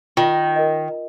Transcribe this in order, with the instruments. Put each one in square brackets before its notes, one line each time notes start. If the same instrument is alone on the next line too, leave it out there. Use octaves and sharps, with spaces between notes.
[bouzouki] D#3 [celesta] F4
[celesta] A#4 D#5